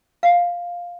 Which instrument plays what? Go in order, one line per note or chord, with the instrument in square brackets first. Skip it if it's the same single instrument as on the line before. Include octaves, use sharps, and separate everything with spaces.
[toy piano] F5